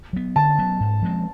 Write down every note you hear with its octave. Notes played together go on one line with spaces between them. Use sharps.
F#3 B3
D3 A5
F#3 B3
G#2
F3 G#3 C4